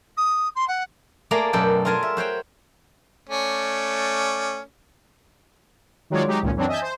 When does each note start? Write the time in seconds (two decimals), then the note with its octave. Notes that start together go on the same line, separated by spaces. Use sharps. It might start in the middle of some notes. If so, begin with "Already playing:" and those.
0.17 D#6
0.55 C6
0.68 F#5
1.31 A3 A#3 G#4 D5 A#5
1.53 F#2 B2 A4 D5 G5
1.85 F4 G#4 A#4 G#5 A5
2.03 E5
2.17 F#4 C5 C#5 G5
3.29 A3 C#4 D5
6.10 D#3 F#3 G#3 F4 C#5 D5
6.27 F#3 G#3 D#4 G4
6.42 G#1 C#2 A#2 C#4
6.55 F#2 E3 F#3 C4 D4
6.68 D#5 E5 G#5 A5 G6
6.82 C5